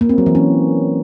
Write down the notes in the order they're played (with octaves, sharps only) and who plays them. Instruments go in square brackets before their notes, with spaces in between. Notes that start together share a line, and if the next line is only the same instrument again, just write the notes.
[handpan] A#3
C4
F#3
E3
C#4